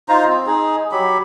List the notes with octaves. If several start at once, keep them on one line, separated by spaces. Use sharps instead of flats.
D#4 F4 C5 A#5
C4
D#4 G#4
F#3 G4 B5